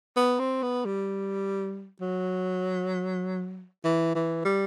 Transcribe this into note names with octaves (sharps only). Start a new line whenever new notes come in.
B3
C4
B3
G3
F#3
E3
E3
G3